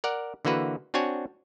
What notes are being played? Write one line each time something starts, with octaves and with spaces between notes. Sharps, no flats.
A#4 D5 F#5
D3 E3 A#3 F#4 B4
C4 D4 F#4 C#5 G#5